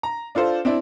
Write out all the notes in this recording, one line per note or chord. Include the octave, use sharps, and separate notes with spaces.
A#5
D4 F4 A4 C5 D5
C4 D4 E4